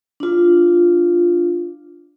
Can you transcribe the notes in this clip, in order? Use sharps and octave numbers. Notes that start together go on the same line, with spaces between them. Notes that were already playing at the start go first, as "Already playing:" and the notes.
D4 F4